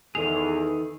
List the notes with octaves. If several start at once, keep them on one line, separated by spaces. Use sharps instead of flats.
E2 D#3 G#4 A4 F7